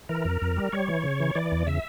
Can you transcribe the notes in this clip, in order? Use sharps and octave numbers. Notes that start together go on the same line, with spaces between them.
E3 A#4
F2
F2
G3
G3 C#5
E3
C#3
E3
E3 D5
E2
C#3 E5